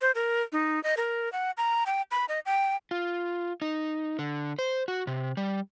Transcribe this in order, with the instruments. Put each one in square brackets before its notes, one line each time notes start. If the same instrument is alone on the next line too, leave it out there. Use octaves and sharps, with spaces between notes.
[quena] C5
A#4
D#4
D#5
A#4
F#5
A#5
G5
B5
D#5
G5
[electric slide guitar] F4
D#4
D3
C5
F#4
C3
G3